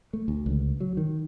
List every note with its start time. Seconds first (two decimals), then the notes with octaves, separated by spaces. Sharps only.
0.13 A3
0.28 D2
0.46 C#2
0.80 F#3
0.97 D#3